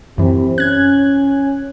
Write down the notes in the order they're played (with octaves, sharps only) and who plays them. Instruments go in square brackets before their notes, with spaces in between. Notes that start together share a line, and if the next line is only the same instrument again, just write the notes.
[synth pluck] F#2 E3 [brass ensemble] C3
[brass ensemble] C#4 [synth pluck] F#6 G#6